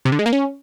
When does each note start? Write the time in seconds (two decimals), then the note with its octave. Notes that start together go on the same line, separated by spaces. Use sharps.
0.05 C3
0.12 D3
0.19 G#3
0.26 A#3
0.33 C#4